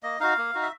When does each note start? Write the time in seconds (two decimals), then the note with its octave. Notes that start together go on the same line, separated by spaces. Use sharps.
0.03 A#3 D#5
0.20 D#4 F#4 F5
0.37 A#3
0.55 D#4 F#4
0.62 E5